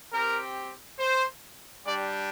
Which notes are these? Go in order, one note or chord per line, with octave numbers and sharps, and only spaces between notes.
C4 G4 A#4
C5
G3 D4 G4 D5